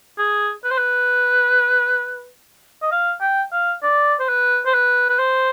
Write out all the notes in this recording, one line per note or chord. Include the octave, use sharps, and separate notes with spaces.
G#4
B4
C5
B4
D#5
F5
G5
F5
D5
C5
B4
C5
B4
B4
C5